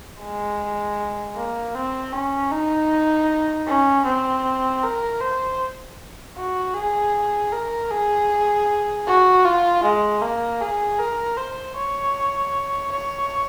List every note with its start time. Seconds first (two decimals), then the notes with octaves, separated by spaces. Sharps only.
0.20 G#3
1.36 A#3
1.74 C4
2.13 C#4
2.51 D#4
3.67 C#4
4.05 C4
4.83 A#4
5.21 C5
6.37 F#4
6.75 G#4
7.52 A#4
7.91 G#4
9.07 F#4
9.45 F4
9.83 G#3
10.22 A#3
10.61 G#4
10.99 A#4
11.37 C5
11.76 C#5
12.92 C#5